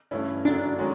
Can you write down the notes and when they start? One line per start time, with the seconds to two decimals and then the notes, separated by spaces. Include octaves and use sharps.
0.11 G2 E3 A3 C#4 E4
0.45 F#2 D3 F#3 D4
0.78 D#3 G#3 C#4 F#4